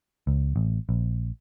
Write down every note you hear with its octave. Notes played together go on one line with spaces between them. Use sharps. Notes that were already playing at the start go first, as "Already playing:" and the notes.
C#2
A1
A#1